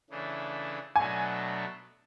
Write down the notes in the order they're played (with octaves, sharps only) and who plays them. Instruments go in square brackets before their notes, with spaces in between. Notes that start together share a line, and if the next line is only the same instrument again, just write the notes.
[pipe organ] C#3 E3 A3 D4
[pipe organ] B2 F#3 A3 D4 [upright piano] G#5